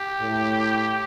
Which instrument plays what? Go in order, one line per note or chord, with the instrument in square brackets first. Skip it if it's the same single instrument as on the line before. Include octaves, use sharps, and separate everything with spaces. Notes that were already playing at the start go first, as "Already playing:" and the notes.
Already playing: [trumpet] G4
[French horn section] A2